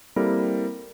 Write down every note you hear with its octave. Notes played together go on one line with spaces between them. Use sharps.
G3 A#3 C4 E4 A4 A#4